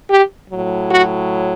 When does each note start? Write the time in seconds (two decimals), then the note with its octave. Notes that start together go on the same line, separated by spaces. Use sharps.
0.09 G4
0.50 A2 F#3
0.89 F#4